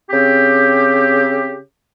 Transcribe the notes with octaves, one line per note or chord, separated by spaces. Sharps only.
C#3 C4 G4